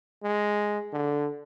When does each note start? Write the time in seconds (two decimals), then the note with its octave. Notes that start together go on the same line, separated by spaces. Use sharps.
0.24 G#3
0.93 D3